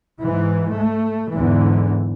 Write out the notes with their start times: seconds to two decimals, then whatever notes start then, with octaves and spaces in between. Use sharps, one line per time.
0.22 G#2 E3
0.71 A3
1.33 E2 G#2 D3 E3